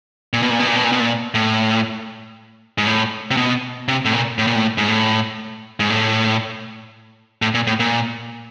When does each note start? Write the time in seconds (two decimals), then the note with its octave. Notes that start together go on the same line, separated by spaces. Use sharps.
0.33 A#2
0.42 B2
0.50 A#2
0.59 B2
0.67 A#2
0.76 B2
0.84 A#2
0.92 B2
1.00 A#2
1.34 A2
2.78 G#2
2.87 A2
3.31 C3
3.37 B2
3.88 C3
4.05 A2
4.13 A#2
4.38 A2
4.47 A#2
4.56 A2
4.78 G#2
4.88 A2
5.80 G#2
5.90 A2
7.42 A2
7.54 A#2
7.67 A2
7.80 A#2